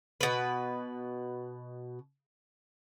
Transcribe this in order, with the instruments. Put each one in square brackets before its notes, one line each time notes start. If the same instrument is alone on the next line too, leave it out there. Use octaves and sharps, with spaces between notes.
[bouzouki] B2 B4